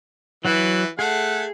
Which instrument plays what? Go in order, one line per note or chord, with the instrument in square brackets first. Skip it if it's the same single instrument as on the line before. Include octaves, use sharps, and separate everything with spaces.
[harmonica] E3 [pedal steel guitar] F#3 F#4 E5
[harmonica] A3 F#5 [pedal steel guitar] G#4